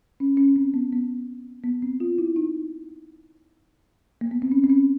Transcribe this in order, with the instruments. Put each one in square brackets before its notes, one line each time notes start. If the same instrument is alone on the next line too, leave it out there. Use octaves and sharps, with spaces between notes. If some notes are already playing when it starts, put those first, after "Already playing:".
[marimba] C#4
C#4
C4
B3
B3
B3
C4
F4
E4
D#4
A#3
B3
C4
C#4
C4
C#4